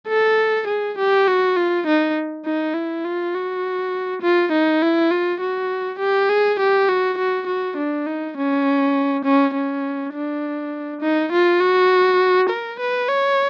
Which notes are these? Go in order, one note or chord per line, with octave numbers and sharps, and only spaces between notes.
A4
G#4
G4
F#4
F4
D#4
D#4
E4
F4
F#4
F4
D#4
E4
F4
F#4
G4
G#4
G4
F#4
F#4
F#4
D4
D#4
C#4
C#4
C#4
D4
D#4
F4
F#4
A#4
B4
C#5